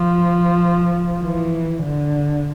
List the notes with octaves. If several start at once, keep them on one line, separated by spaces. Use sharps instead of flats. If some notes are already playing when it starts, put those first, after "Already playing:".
Already playing: F3
E3
D3